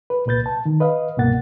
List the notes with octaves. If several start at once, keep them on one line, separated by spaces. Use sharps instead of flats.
B4
C2 A#2 B4 G6 A6
A5
D#3
B4 D#5 F5
C2 G2 B2 A#3 F#5 A6